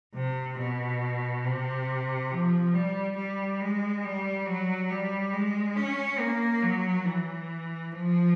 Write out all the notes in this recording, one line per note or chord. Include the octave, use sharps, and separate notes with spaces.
C3
B2
C3
F3
G3
G3
G#3
G3
F#3
G3
G#3
C#4
A#3
F#3
E3
F3